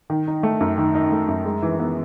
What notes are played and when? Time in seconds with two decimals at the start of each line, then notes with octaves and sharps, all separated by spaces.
0.10 D#3
0.28 D#4
0.43 A3
0.61 F#2
0.78 D#3
0.95 D#4
1.12 A3
1.28 F#2
1.45 G#3
1.62 E3
1.79 B3